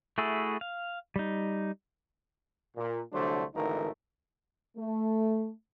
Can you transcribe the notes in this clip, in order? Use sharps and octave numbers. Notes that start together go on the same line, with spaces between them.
A3 E4 F#4 G#4 A4
F5
G3 D#4
A#2
C2 D3 F#3 A3 D4 C5
G#1 D3 E3 A3 D#4 A#4
A3